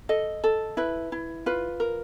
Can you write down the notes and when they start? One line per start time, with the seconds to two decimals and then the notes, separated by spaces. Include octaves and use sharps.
0.09 A4 D#5
0.44 A4
0.77 E4 B4
1.12 E4
1.46 F4 B4
1.80 A#4